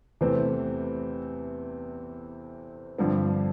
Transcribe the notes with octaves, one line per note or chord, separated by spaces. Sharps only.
E2 C3 E3 A3 C4
G2 D3 F3 C4